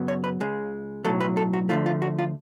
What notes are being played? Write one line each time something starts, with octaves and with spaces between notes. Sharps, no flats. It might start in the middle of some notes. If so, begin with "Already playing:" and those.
Already playing: F#2 C#3 F#3 B3
C#5
B4
C#2 C#3 G#3
B1 A2 F#3 A4
B4
A4
F#4
D2 D3 F3 A3 F4
F4
F#4
F4